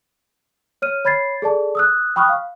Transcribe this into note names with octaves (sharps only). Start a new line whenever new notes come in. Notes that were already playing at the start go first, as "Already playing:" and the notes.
C#5 F6 D#7
C#5 B5 G#6 A6 C7
G#4 A4 D5 A5
D#6 E6 F#6
G5 B5 C#6 D#6 F6 F#6
F5